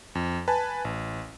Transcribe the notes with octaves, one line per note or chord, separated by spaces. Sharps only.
F2
B4 G#5 A5
A1